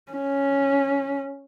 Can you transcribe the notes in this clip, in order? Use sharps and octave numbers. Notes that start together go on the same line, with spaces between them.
C#4